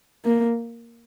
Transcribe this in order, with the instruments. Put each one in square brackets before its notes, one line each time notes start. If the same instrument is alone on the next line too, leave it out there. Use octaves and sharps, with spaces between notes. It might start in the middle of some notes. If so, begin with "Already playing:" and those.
[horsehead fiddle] A#3